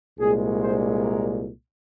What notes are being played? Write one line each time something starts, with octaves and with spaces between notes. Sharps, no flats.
C2 A#2 G#3 G#4
C5
A#4